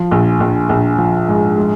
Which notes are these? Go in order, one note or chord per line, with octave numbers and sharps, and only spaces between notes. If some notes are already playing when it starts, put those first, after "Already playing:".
Already playing: F3
A#1
A#1
A#1
F3
G#2
G#3